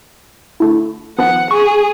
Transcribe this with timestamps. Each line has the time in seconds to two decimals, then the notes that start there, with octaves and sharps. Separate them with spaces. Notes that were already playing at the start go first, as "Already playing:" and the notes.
0.60 D3 A3 E4
1.19 D#3 F3 B3 F#5
1.51 G#4 C#6